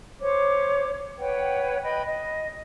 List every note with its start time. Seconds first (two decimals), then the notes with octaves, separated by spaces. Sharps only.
0.21 C5 C#5 D6
1.19 B4 C#5 F#5 G5
1.83 B4 D#5 G5 B5
2.06 D#5